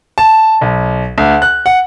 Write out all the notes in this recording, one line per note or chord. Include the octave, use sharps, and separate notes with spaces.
A5
B1
D2
F#6
F#5